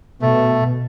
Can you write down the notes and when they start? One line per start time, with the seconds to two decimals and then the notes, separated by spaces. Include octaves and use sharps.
0.22 B2 A3